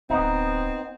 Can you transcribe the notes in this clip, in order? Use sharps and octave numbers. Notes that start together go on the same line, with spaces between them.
D1 B3 C4 D#4